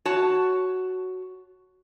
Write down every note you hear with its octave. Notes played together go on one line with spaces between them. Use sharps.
F#4 C#5 A5